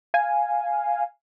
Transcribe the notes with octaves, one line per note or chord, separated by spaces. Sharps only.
F5 G#5